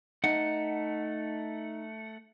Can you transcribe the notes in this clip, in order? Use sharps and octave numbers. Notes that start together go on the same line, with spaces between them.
A3 D#4 F#5